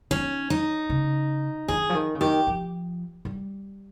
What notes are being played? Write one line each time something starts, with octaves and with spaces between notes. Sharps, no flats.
D#3 C#4
D#4
C#3
D#3 G#4
F3
D#3
C#3
D#3 G4
F3
G3